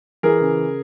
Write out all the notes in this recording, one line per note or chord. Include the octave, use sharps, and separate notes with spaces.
E3 G#4 A#4
C#3